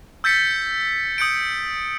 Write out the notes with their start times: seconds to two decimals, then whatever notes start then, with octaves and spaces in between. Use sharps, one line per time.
0.24 E6 G6 A6 B6 C#7
1.18 D#6 G6 C#7 D7